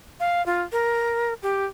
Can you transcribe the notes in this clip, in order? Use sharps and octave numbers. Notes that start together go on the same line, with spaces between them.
F5
F4
A#4
G4